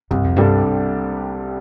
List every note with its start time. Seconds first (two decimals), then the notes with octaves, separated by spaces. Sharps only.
0.11 C2 G2
0.24 F2
0.36 G2 C3 G3 D4 A4